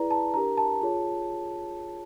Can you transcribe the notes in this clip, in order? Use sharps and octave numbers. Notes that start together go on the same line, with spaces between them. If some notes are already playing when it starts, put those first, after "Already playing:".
Already playing: E4 G#4 B4 D5 A#5
A5
D4 G4 A#4 A#5
A5
F4 G#4 C#5